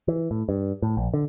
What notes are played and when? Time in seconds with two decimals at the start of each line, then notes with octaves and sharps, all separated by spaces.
0.08 E3
0.31 A2
0.49 G2
0.82 A2
0.97 A#1
1.14 D3